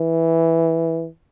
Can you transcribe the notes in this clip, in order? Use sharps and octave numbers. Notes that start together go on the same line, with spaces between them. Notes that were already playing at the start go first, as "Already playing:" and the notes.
Already playing: E3